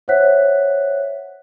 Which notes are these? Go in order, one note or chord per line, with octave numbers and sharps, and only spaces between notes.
C5 C#5 E5 F#5 F#6 B6